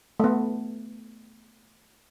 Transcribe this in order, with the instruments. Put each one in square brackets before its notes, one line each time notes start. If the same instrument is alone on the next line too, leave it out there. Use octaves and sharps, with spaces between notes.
[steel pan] A3 B3